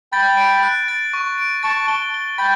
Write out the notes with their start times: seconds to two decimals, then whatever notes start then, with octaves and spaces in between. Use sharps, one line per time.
0.12 G5 B5 A6
0.37 D7
0.63 F#6
0.88 A6
1.13 C#6
1.38 D7
1.63 A5 C#6 A6
1.88 G7
2.14 G7
2.38 G5 B5 A6